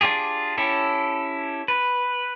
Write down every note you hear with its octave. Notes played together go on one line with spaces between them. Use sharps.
D4 F4 G4 G#4
C#4 E4 G4 A4
B4